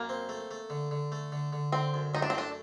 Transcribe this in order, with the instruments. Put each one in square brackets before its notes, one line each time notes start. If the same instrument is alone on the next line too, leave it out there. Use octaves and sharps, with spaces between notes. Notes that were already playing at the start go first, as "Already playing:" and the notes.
Already playing: [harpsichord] F#2 [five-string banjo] A#3
[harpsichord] C4
A3
A3
D3
D3
A3
D3
D3
[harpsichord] D3 [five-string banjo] C4
[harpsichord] F#2
[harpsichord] F#2 [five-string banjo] D#4
[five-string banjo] D4
C4
[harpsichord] A3 [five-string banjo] D4